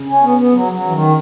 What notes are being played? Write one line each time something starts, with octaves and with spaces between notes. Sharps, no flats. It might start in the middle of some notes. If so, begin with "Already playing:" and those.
Already playing: C#3
C#4
B3
B3
F#3
F#3
E3
D#3